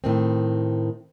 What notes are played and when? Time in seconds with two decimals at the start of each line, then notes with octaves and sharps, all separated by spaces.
0.04 A2 D#3 C4